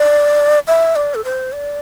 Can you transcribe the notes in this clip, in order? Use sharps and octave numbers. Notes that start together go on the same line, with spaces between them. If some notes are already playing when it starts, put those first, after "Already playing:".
Already playing: D5
E5
D5
A4
C5
D5